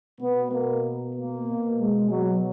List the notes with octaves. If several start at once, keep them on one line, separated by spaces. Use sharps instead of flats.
B2 B3
A#3
A#3
B2
G#3
F#3